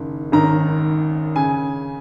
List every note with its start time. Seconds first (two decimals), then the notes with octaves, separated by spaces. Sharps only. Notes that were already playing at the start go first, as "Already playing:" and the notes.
Already playing: F#1 D#3
0.32 G#1 F#2 D#3 A#5
1.36 C#3 G#5